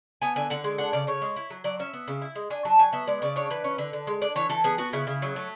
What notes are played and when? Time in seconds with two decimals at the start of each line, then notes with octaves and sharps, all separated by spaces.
0.22 B3 G#5
0.36 D3 G#5
0.50 D3 F#5
0.64 G#3
0.78 D4 F#5
0.93 C#3 D5
1.07 C#3 C#5
1.22 G#3
1.36 E4
1.50 F#3
1.64 F#3 D5
1.79 C#4 E5
1.93 B3
2.08 C#3
2.21 E4
2.35 G#3
2.50 D4 G#5
2.65 F#3 A5
2.79 F#3 G#5
2.93 B3 E5
3.07 G#3 D5
3.22 C#3 D5
3.36 D4 C#5
3.50 E3 B4
3.64 C#4
3.78 D3
3.93 D3
4.07 G#3
4.21 D4 D5
4.36 E3 C#5
4.50 E3 A4
4.64 B3 G#4
4.78 B3 F#4
4.93 C#3 E4
5.07 C#3
5.22 F#3
5.36 A3